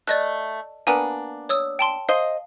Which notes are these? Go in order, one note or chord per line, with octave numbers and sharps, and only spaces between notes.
A3 D5 D#5 F#6
A#3 B3 D4 G#5
C#5 D#6 E6
G5 A5 C6
C5 D#5 F5